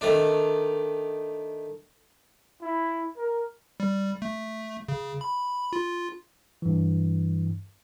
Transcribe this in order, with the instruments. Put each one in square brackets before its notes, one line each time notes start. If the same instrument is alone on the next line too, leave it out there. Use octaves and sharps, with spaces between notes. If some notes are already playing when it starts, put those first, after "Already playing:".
[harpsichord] D#3 A3 D4
[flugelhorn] E4
A#4
[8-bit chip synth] G3
A3
C#3
B5
F4
[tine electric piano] G2 E3